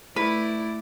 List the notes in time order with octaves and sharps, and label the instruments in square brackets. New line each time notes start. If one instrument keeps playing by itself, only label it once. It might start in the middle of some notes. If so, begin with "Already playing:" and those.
[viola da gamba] A3 E4 D5 [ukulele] B4